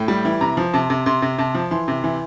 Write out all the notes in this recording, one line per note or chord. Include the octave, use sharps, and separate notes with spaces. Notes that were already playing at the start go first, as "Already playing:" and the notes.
Already playing: A2 G5
G3
E3
C3 A#5
F3
C3 A5
C3
C3 C6
C3
C3 A5
F3
E3 C6
C3
E3